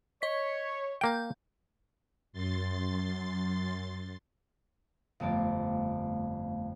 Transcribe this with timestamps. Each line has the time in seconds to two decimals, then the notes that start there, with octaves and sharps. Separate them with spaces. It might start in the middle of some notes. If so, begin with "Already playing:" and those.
0.22 C#5 D#5 B6
1.01 A#3 F5 G5 G6
2.33 F#2 C6 A6
5.20 G1 F2 A3 B3 D5 F5